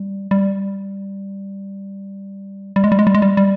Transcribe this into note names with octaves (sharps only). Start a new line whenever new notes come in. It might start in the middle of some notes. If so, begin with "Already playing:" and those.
Already playing: G3
G3
G3
G#3
G3
G#3
G3
G#3
G3
G3